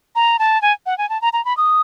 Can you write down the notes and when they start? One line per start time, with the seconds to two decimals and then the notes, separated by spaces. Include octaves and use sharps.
0.16 A#5
0.39 A5
0.62 G#5
0.86 F#5
0.98 G#5
1.10 A5
1.22 A#5
1.33 A#5
1.45 B5
1.57 D#6